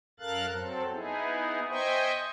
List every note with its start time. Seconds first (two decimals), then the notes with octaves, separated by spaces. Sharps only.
0.20 F#2 A4 A#4 F5 F#6 A6
0.52 F#3 C4 A4
0.92 B3 D#4 E4 G#4
1.69 C5 D#5 E5 G5 G#5 C#6